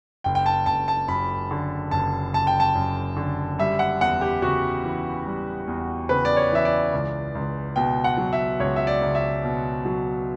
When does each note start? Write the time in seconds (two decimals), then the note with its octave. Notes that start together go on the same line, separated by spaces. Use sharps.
0.24 F#1 G5
0.35 G5
0.46 A5
0.66 F#1 A5
0.88 A5
1.08 F#2 B5
1.51 D3
1.91 F#1 A5
2.33 F#1 A5
2.47 G5
2.60 A5
2.75 F#2
3.17 D3
3.59 G3 E5
3.79 F#5
4.01 E2 F#5
4.21 G4
4.42 C#3 F#4
4.84 E3
5.26 G3
5.67 E2
6.09 C#3 B4
6.25 D5
6.37 C#5
6.52 E3 E5
6.65 D5
6.93 C#2
7.35 C#2
7.76 B2 G5
8.04 F#5
8.17 F#3
8.33 E5
8.60 C#2 C#5
8.76 E5
8.87 D5
9.02 C#2
9.15 E5
9.44 B2
9.85 F#3